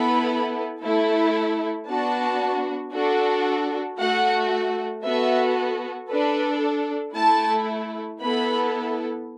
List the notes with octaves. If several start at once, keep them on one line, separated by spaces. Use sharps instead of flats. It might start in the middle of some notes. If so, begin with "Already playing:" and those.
Already playing: B3 E4 A4 B5
A3 E4 A4
B3 D4 F#4 A5
D4 F#4 A4
A3 F#4 A4 F#5
B3 F#4 A4 E5
D4 A4 B4
A3 E4 A4 A5
B3 E4 A4 B5